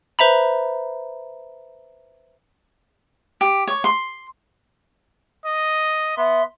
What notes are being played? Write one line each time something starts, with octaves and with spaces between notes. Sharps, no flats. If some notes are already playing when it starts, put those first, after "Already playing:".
B4 C5 E5 A#5 B5
G4
C#5
C6
D#5
B3 E5 C6